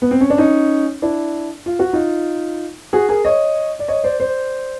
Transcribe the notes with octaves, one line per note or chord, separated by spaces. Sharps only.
B3
C4
C#4
D4
C#4 D#4
D4 E4
F4
F#4
D#4 F4
F#4 G#4
G#4 A#4
C#5 D#5
D5
C#5 D#5
C5 D5
C5 D5